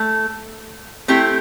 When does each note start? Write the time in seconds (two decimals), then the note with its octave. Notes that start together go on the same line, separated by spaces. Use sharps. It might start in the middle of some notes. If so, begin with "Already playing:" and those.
Already playing: A3
1.08 A3 C4 E4 G4